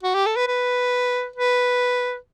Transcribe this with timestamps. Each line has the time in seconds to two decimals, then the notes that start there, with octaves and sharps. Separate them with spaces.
0.03 F#4
0.15 G4
0.26 A4
0.36 B4
0.48 B4
1.36 B4